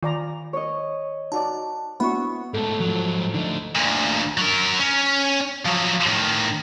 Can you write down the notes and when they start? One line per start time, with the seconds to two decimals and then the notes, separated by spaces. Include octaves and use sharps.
0.03 D#3 F4 D5 A#5
0.53 C#5 D#5
1.32 D#4 F#4 D5 A5
2.00 B3 D4 E4 F#4 F#5 B5 C#6
2.54 G#2 A3 A4
2.80 G#2 F3 F#3
3.34 D3 A3 D#4
3.75 D2 A#2
4.37 F#3 A#4
4.80 C#4
5.66 F3 F#3
6.06 A2 D#3